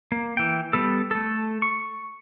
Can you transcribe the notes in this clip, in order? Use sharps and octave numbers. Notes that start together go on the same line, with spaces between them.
A#3
E3 G5
G3 B3 A4
A3 A4
C#6